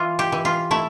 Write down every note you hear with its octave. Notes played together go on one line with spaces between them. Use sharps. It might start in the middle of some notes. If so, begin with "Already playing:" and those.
Already playing: E3 F4
G4
E3
F4
A3 E4